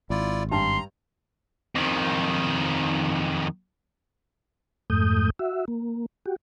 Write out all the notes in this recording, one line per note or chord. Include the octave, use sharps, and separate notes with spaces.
G#1 E4 F4 D5
G2 A5 A#5 C6
F2 D#3
F2 G#2 A3 D#6 G6
F#4 E5
A#3
F#4 G4